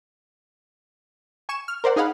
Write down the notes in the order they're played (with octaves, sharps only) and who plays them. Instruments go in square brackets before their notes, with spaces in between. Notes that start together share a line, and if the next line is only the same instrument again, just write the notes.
[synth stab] G#5 C#6 E7
F6
A#4 C5 D5 F#5
D#4 G#4 D#5 F5 F#5 B5